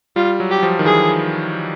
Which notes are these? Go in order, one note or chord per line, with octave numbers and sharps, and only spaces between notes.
G3 F4
F#3
G4
F3
D#3
E3 G#4